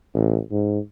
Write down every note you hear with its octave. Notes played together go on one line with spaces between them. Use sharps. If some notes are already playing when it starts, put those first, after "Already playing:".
A1
G#2